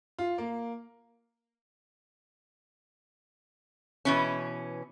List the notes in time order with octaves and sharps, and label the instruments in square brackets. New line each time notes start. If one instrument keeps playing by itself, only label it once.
[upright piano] F4
A#3
[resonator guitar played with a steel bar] B2 E3 C#4